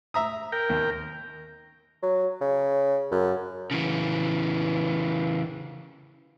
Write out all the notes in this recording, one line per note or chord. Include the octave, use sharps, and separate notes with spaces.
E5 A#5 D#6
A#4 G5
D#2
F#3
C#3
F#2
C#3 E3